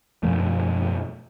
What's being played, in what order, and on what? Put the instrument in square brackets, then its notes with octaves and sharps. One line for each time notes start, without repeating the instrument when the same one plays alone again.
[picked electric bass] F#2 B2 F3 A3